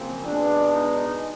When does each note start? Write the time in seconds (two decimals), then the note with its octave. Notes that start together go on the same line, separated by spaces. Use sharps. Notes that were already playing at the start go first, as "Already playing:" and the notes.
Already playing: F#2 C#3 F3 A#3 C4
0.25 B2 G#3 B3 D4
0.71 D#4